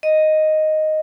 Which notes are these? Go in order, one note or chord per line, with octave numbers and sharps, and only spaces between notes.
D#5